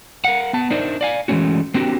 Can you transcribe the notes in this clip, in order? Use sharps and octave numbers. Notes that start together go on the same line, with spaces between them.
A#4 F5 F#5
B3 A5
D4 D#4 A#4 C5 D5 E5
D5 F5 G#5
E3 G#3 A3 C4 C#4 F#4
A#3 C4 D4 F#4 G4